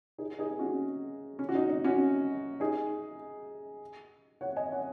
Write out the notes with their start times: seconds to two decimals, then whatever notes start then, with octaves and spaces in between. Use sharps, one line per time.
0.18 D#4 G#4
0.39 D#4 G#4
0.59 C#4 F#4
1.39 C#4
1.49 F#4
1.55 D#4
1.70 D#4
1.84 C#4 F#4
2.60 D#4 G#4
4.41 C#5 F#5
4.56 D#5 G#5
4.72 C#5 F#5